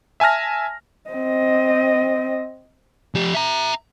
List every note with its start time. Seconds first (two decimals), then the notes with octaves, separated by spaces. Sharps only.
0.20 E5 G#5 A5 F6 A#6
1.10 C4 D#5
3.15 F3 G4
3.34 E5 A#5